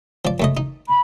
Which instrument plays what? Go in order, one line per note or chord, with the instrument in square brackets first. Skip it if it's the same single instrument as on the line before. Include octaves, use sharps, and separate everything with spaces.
[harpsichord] F3 D5
F#2 A3 D#5
D#4
[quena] B5